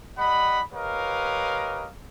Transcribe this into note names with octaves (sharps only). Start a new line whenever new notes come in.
G3 D#5 F#5 B5
G4 A#4 B4 C#5 D#5 F5